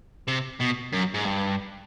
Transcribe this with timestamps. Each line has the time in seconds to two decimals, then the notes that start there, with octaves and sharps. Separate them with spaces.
0.28 C3
0.61 B2
0.93 F#2
1.14 G#2
1.25 G2